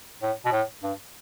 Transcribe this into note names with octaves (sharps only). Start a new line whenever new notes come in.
A2
B2
A2
G2